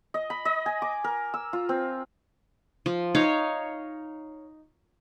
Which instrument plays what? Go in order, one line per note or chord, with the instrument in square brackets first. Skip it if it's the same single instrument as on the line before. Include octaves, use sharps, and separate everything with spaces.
[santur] D#5
B5
D#5
G#5
D6
A#4
E6
F4
C4
[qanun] F3
D#4 C#5 F5